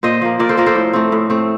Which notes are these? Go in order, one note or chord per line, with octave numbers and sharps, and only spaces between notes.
A#2 C5 D#5
F3 A#3
A#2 A#4 D5
A4 C5
F3 A#3 A#4 D5
A4 C5
A2
A3 C4
A2
A3 C4